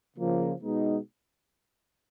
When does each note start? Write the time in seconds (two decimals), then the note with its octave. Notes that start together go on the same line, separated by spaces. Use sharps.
0.17 C#3 F3 A#3
0.62 B2 G#3 B3 D#4